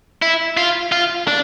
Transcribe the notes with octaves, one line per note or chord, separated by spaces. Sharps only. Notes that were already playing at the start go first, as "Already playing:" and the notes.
E4
F4
F4
D4